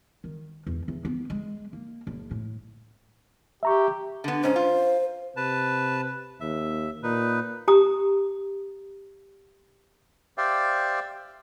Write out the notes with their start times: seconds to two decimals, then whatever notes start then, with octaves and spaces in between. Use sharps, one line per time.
0.24 D#3
0.66 E2
0.88 E2
1.05 B3
1.30 G#3
1.73 A#3
2.07 F#1
2.31 A2
3.63 G4 E5 A#5 C#6
4.24 D3 B3
4.43 G#2 C#4 C5
4.56 F4
5.37 C3 B4 A5
6.41 D#2 E5
7.03 A#2 D#4 B4
7.68 G4 A#5 D#6
10.38 G4 C5 D5 E5 F5 G5